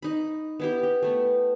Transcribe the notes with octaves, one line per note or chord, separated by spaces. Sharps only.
D#4 B5
B3 E4 G4
G4
A3 B3